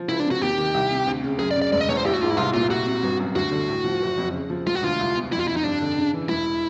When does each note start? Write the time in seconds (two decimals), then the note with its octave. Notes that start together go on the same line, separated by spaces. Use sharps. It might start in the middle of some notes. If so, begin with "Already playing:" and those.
Already playing: F3
0.09 C#2 E4
0.20 D4
0.26 C3
0.31 F#4
0.42 D#2 G4
0.58 D#3
0.74 C2
0.91 C3
1.07 D2
1.24 C#3
1.39 F#2 G#4
1.51 D5
1.56 C#3
1.62 D5
1.72 E1 D5
1.80 D#5
1.88 E2 C#5
1.97 C5
2.05 A1 G4
2.14 F#4
2.21 G#2 F4
2.30 E4
2.37 C2 F4
2.54 A#2 F4
2.70 C2 F#4
2.86 C3
3.03 G1
3.19 F#2
3.35 D2 F#4
3.51 D3
3.69 A2
3.84 F3
4.01 F#1
4.17 F2
4.33 C#3
4.50 F3
4.66 E1 F4
4.75 F#4
4.83 D2 F4
4.99 C2
5.16 B2
5.32 F2 E4
5.39 F4
5.48 C3 E4
5.57 D#4
5.64 G2 D4
5.81 D3
5.96 C#3
6.13 E3
6.29 E1 E4